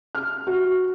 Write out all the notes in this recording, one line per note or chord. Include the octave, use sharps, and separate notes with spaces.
F6
F#4